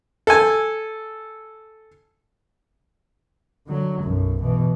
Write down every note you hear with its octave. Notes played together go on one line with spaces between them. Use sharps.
A4 G#5
D3 F#3
B1 F#2
B2 E3